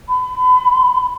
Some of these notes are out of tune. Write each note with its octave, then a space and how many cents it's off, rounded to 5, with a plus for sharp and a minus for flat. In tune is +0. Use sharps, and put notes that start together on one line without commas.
B5 +35